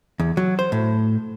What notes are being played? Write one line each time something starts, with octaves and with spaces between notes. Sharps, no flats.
E2
F#3
C5
A2